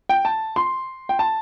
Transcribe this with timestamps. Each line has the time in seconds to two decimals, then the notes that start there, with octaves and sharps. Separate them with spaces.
0.09 G5
0.25 A5
0.56 C6
1.09 G5
1.19 A5